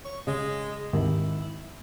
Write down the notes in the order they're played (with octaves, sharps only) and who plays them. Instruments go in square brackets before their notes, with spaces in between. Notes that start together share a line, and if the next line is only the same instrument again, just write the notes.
[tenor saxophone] C#5
[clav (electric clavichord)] C#3 [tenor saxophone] G#3
[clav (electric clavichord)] G#1 D#2 D#3 [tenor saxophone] E4